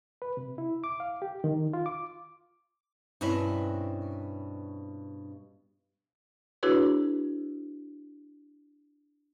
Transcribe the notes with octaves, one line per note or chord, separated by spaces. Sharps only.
B4
C3
E4
D6
F5
G4
D#3
F4
D6
G2 B2 C4 C#4 E4
D4 E4 F#4 G#4 B4 C#5